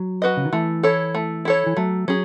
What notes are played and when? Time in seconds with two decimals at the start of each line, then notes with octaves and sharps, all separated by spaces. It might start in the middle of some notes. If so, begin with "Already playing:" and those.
Already playing: F#3
0.22 F#4 B4 D#5
0.37 C#3
0.45 D#3
0.53 E3 A3
0.83 E4 A4 C#5
1.14 A3
1.45 E4 A4 C#5
1.66 E3
1.77 F#3 A3
2.08 F#3 C#4 G#4